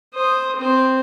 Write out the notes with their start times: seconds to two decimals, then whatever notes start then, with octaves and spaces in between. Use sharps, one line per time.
0.14 C5 D#6
0.56 C4 C5